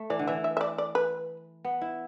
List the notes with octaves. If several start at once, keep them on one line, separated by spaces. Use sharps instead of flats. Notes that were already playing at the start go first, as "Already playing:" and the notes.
Already playing: A3
E3 D5
D3
E3 E5
E5
E5
D5
D5
B4
B3
E4